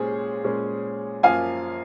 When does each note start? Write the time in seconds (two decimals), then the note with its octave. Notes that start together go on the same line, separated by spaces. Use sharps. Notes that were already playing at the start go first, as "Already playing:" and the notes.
Already playing: A#2 G#3 C#4 G#4 C5 C#5
0.44 A#2 G#3 C#4
1.23 F#2 F3 A#3 F4 F5 G#5